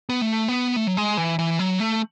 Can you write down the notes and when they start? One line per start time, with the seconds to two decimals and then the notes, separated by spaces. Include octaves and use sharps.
0.09 B3
0.22 A3
0.48 B3
0.76 A3
0.87 F#3
0.97 G#3
1.17 E3
1.39 E3
1.59 F#3
1.80 A3